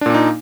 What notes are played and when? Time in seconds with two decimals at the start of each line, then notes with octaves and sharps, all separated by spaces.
0.01 D4
0.06 A#2
0.10 A#3
0.14 D#4